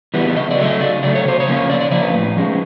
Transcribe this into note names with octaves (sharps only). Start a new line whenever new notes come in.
E3 G3 B3
C#3 D#5
D5
F#3 A3
D#5
C#3 D5
F#3 A3 D5
C#5
C#3 C5
C#5
F3 A#3 C#4
C#3 D5
D5
F3 A#3 C#4 D5
B4
A2
F3 G#3 C#4